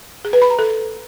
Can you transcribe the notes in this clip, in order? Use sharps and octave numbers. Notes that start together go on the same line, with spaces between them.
G#4
B4
B5
A#5
A4